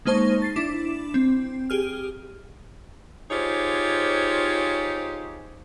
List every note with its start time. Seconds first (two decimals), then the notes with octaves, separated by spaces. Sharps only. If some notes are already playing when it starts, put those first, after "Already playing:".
0.05 G#3 A#3 D#4 C5 A5 C#6
0.42 A6 C7
0.56 D4 E4 D6 E7
1.14 C4
1.70 G4 G#4 F6
3.31 D#4 F4 G4 G#4 C5 C#5